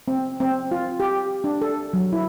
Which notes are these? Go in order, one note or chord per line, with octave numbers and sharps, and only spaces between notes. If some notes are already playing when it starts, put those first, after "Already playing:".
C4
C4
F4
G4
D4
A4
F#3
E4